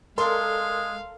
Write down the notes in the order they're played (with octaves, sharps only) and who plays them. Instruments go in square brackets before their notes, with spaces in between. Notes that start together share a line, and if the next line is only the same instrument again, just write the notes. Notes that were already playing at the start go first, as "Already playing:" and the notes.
[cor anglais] G#3 [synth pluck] A4 A#4 D5 [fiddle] F5 [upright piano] C6